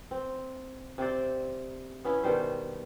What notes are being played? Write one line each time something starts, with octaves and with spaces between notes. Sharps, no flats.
C4
C3 C4 C5 D5
B3 C#4 E4
B2 D#3 G3 C5